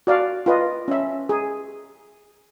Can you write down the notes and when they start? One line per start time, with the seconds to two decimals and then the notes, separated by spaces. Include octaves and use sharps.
0.07 F#4 D5 F5
0.46 F4 B4 D#5
0.88 C#4 E5
1.29 G#4